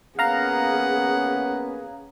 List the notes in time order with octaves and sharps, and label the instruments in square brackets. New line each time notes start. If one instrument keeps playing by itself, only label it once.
[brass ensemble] A#3 B3 C#4 [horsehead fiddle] G#4 [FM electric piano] F5 A#5 [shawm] F#5